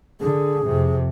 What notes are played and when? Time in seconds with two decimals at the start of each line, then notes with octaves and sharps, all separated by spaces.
0.20 D3 G#4
0.66 F2 C3